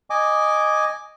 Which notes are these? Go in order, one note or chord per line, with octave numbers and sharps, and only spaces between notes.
D#5 G#5 D6